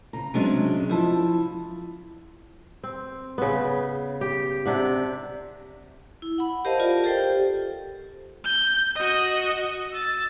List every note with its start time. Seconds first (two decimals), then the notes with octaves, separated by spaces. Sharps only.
0.13 C#3 A#5
0.34 C3 F#3 G#3 C#4 D4
0.89 F3 E4 A5
2.83 C4
3.38 C#3 B3
4.21 G4
4.66 C3 D4 F#5
6.22 E4
6.38 F#5 B5
6.65 G4 A#4 C5 D#5 F5 A5
6.79 F4 G4 A#4 D5
7.04 G4 A4 C5 G5
8.44 G6
8.96 F#4 D#5
9.93 E6 A6